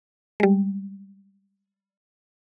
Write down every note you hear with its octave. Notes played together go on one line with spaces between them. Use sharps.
G3 G#3